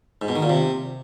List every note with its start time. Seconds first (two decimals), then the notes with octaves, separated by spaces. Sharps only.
0.22 G#2
0.29 B2
0.36 D#3
0.43 A#2
0.49 C3